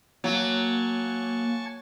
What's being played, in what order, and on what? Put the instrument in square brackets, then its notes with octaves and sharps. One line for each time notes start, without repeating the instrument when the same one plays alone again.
[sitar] F#3 [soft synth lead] A#3 [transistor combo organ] G#5 A5 C#6